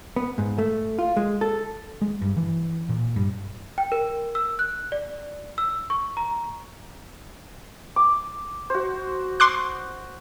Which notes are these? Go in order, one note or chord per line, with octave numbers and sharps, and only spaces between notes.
B3
G#2
A3
F4
G#3
A4
G#3
G2
E3
A#2
G2
G5
A#4
E6
F#6
D5
E6
C#6
A#5
D6
F#4 C5
C6 D6 F#6